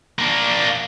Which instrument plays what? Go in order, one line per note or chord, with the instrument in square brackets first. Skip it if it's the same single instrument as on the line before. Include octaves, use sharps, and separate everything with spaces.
[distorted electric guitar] A#3 D4